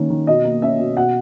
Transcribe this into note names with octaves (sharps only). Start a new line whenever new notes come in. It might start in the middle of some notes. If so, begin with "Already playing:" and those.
Already playing: D#3 A#3 C#4
D#3
B2 D#5
A#3
C#4 E5
B2
B2 F#5